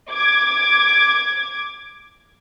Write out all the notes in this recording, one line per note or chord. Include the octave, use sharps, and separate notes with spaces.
D6 G#6